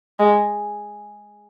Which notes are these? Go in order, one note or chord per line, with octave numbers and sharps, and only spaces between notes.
G#3